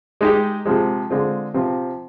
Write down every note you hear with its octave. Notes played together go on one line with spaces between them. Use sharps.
G#3 D#4 G4
C3 F3 G#3
D3 G#3 C4 F4
C3 F3 C4 F4